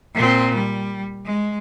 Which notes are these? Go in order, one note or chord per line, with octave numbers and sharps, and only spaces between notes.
A#2 C4
G3
G#3